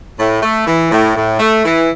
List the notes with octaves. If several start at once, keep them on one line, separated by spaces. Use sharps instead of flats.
A2
A3
E3
A2
A2
A3
E3